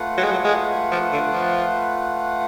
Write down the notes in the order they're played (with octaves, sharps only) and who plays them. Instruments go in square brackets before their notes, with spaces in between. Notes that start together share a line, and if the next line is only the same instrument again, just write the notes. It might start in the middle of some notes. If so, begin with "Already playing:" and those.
Already playing: [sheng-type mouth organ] A3 F4 B4 F#5
[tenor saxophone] F#3
G#3
F#3
G#3
F3
D3
F3